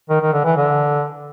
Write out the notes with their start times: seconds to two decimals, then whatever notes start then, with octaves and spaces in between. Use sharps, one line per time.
0.09 D#3
0.21 D#3
0.33 D3
0.44 E3
0.56 D3